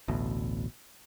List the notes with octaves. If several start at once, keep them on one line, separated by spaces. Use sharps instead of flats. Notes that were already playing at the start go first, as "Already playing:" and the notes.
A1 D2 B2